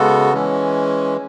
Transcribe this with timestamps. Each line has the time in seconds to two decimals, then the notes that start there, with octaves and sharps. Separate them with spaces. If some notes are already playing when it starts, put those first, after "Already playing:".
Already playing: C#3 G#3 B3 F#4 A4
0.34 E3 G#3 C#4